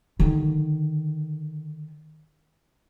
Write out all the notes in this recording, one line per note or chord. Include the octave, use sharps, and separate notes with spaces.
D3 D#3